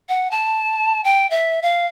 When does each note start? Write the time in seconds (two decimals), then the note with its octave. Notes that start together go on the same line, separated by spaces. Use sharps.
0.09 F#5
0.31 A5
1.04 G5
1.30 E5
1.62 F5